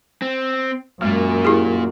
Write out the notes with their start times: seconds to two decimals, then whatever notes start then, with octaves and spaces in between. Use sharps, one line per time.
0.22 C4
1.02 F#2 A#2 G#3 A#3
1.45 E4 G4 G#4